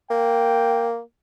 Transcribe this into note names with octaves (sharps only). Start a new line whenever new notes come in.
A#3 G5